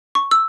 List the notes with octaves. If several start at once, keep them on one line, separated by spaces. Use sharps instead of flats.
C#6
E6